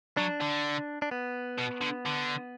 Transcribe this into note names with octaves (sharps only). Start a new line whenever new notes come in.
F#3 D4
D3
D4
B3
B2
D3
D3